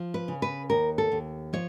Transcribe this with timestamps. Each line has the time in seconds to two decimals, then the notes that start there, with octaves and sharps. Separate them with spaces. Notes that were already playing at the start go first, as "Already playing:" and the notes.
Already playing: F3
0.14 B4
0.28 C#3
0.42 B4
0.70 D#2 A#4
0.98 A4
1.12 D#2
1.53 F3 C#5